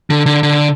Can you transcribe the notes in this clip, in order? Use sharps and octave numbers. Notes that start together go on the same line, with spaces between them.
D3
D3
D3